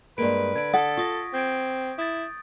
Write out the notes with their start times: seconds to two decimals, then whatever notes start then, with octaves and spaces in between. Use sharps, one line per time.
0.18 G2 G#3 A#3 B4 D7
0.56 D3 G#6 D7
0.74 A4 F#5 D#6 A6 B6
0.97 F4 C#6 D#6 A#6
1.34 C4 G6 G#6 D7
1.99 E4 D#6 A6